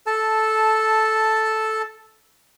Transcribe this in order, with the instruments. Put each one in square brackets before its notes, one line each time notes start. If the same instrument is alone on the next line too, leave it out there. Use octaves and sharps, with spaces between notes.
[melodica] A4 A5